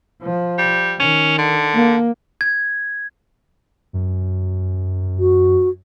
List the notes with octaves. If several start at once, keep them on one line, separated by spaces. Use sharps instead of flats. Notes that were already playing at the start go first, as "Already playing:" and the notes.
F3
G3
D#3 C#4
D3
A#3
G#6
F#2
F#4